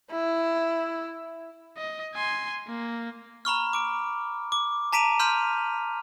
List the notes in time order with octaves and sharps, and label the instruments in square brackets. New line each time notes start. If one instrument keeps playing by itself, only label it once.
[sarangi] E4
[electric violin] D#5
G#5 C6
A#3
[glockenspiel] A#5 B5 C#6 F6
D6 D7
D6
A5 A#5 B6 D7 D#7 F7
C6 F6 G6 B6 D#7